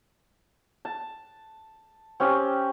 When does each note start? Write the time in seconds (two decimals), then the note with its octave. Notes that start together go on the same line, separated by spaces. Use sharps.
0.85 A5
2.20 C4 C#4 G4